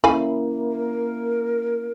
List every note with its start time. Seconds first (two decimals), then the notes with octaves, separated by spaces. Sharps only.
0.04 A#3 C#4 E4 F5 G#5 B5
0.71 A#4